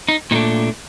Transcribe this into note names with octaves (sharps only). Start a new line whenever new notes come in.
D#4
A#2 A3 D4 D#4